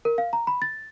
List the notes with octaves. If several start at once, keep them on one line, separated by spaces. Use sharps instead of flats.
A#4
F5
A#5
B5
A6